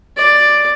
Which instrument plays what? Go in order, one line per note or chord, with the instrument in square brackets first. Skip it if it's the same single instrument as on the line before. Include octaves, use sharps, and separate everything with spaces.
[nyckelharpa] D5